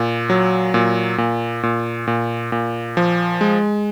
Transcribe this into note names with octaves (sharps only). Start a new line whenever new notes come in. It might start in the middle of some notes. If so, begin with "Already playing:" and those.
Already playing: A#2
F#3
A#2
A#2
A#2
A#2
A#2
F3
G#3